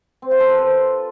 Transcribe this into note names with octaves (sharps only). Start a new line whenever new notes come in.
C4
F4
A4
B4
C5